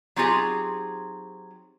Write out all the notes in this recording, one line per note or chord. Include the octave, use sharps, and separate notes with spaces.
F#3 C4 D#4 F4 G4 G#4